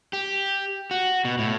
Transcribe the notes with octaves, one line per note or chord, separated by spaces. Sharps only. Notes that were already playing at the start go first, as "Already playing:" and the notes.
G4
F#4
B2
A2